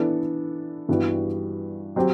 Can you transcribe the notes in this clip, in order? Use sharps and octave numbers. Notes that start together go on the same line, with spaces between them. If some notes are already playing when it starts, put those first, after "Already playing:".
Already playing: E3 B3 D4 A4
G2 E3 G3 B3 F#4
F#3 C4 G4